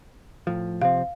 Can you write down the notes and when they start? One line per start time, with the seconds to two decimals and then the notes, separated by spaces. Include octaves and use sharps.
0.47 A2 F3
0.81 C3 F3 C4 F5